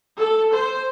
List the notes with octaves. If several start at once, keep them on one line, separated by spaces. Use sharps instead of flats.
A4
C5